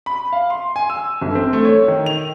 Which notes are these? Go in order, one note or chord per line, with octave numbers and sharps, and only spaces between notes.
B5
F5
C6
G#5
E6
G1
C4
A3
C#5
D#3
F7